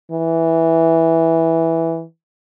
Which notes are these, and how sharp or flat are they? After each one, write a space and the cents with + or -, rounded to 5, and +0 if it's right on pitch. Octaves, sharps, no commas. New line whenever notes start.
E3 -5